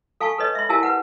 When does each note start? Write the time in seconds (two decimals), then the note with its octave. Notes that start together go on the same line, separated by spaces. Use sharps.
0.20 A4 F5 G#5 A5 C#6
0.38 A4 B4 C#5 D#5
0.55 E5 C6
0.69 E4 G4 A#4 F5 G#5 A5
0.83 B4 F#5